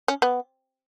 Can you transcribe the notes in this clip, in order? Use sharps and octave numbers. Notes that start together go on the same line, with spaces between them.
C#4
B3